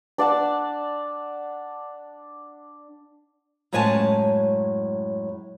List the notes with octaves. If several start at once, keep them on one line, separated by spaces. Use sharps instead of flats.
D4 D5 F#5 A5
F#2 A2 G#3 C#5 G#5 A5